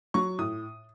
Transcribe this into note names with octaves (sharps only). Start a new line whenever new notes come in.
F#3 C#6
A2 D#6